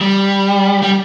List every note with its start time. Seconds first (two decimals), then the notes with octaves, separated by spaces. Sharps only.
0.01 G3
0.82 G3